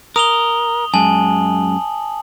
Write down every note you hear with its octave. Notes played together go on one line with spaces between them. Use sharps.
A#4 D#6 F7 G7
F#2 G#3 G#5 A5 F#7